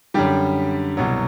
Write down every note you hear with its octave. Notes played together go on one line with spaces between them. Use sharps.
F#2 D3 G3 G4
C2 B2 F#3